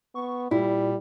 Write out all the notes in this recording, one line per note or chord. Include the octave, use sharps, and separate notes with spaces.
B3 C#6
A#2 G3 E4